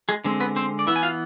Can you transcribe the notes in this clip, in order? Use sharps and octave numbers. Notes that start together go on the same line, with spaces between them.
G#3 G#4
D3 G#3 C4
B3 B4
C4 C5
D5
E3 B3 E4 E5
G#5
F4 F5